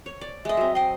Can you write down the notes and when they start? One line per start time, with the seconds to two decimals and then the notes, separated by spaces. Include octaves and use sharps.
0.06 C#5
0.21 D5
0.45 G#3 D#5 E5
0.57 F#3 C4
0.75 D#5 G5 C6